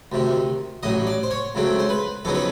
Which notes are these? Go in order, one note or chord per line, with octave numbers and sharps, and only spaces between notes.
D2 C3 D#3
A1 A2 F#3 D#5
D5
C5
C#5
C#2 C#3 F#3 A3 C4
C5
B4
F2 C#3 F#3 B3 D#4 A4
B4